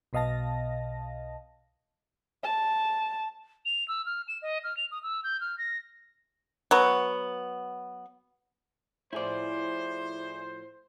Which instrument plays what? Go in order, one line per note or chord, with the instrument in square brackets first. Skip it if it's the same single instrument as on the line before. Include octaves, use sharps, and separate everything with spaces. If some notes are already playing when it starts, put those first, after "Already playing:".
[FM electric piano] B1 B2 D#5 F5 A5 A#6
[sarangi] A5
[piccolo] F7
E6
F6
E7
D#5
F6
F7
D#6
E6
G6
F6
A#6
[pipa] F#3 B3
[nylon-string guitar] A2 F3 [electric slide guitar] E4 G#4 D5 [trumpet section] C5